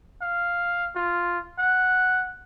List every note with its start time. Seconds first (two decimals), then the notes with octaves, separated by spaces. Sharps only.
0.21 F5
0.96 F4
1.58 F#5